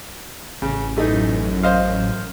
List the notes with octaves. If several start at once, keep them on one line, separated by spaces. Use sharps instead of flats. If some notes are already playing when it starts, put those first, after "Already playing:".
A1 C#3
F#2 E3 A3 D#4
C5 D#5 F5